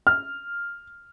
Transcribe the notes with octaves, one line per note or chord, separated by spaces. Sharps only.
F6